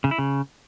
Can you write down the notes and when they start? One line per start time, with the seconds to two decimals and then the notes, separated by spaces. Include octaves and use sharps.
0.04 C#3
0.11 E4
0.18 C#3